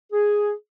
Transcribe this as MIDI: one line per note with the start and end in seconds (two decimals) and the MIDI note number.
0.13 0.52 68